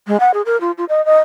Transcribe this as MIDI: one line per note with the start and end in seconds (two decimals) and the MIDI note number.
0.07 0.20 56
0.20 0.31 78
0.34 0.42 68
0.46 0.59 70
0.61 0.72 65
0.78 0.85 65
0.89 1.04 75
1.05 1.18 75